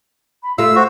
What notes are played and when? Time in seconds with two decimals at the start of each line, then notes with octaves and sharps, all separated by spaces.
0.43 B5
0.58 A3 F4 E5 E6
0.76 F#4 C5